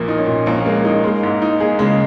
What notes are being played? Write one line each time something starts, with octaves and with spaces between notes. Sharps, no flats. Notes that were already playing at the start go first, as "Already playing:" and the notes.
Already playing: A#1 A#2 A#3
D#4
C#4
A#2
A#1 A#3
G#3 A#3
G#3 D#4
G#3 A#3
G#2
D#4
A#3 G#4
C#3 G#3